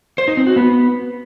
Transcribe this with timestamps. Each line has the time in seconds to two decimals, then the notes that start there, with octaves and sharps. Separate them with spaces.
0.18 C5
0.28 D#4
0.37 C4
0.47 F#4
0.56 B3